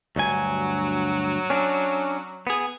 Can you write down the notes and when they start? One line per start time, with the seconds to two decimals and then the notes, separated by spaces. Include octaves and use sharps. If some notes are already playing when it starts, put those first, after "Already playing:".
0.16 D2 G2 F#3 G#5
1.50 C#4 D4
2.47 B3 G#4